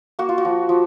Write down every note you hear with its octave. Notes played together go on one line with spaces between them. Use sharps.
A#3 F#4
F4
F#4
F3
F3